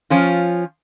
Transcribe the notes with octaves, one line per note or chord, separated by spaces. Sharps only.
F3 C#4 F4